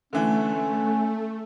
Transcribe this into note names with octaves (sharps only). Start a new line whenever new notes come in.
D3 E3 A3 C#4